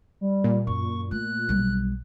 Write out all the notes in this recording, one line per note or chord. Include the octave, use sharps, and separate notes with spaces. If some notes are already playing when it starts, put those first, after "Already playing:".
G3
A#2
F#2 C#6
A3 F#6
B1 G3